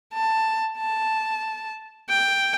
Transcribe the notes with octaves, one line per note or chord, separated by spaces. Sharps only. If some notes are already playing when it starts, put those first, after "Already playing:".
A5
A5
G5